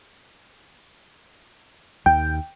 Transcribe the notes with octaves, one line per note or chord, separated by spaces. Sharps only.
D#2 G5